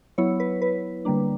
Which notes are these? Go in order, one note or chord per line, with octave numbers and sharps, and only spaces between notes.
F#3 B3 E4 C#5
B4
B4
D3 G3 A#3 D4